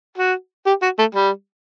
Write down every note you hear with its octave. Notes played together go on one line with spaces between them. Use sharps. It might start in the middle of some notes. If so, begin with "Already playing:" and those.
F#4
G4
F#4
A3
G3